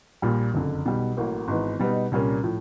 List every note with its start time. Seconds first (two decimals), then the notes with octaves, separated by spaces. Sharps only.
0.22 A#1 A#2 G3
0.54 F#1 F2 D3
0.85 B1 B2 G3
1.17 A1 A2 F#3 A#3
1.48 G#1 G#2 E3 G#3 B3
1.80 B2 G3 B3 D#4
2.11 C2 A#2 G3 A#3 C#4
2.43 A2 F3